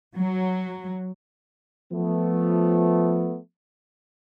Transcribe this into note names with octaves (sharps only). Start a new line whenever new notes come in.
F#3
F3 A3 B3